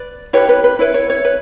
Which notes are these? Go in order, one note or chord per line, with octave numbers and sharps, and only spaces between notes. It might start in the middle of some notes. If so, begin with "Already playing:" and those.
Already playing: B4 D5
E4 G4 B4 C#5
B4
B4
E4 B4 C#5
C#5
C#5
B4